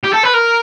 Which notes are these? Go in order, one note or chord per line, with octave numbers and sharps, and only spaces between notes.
G4
A4
B4
A#4